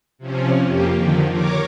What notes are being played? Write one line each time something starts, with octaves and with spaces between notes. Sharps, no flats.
C3 F3 C#4
F2 A#3 G4
D3 D#3 F3
A#4 C#5 D6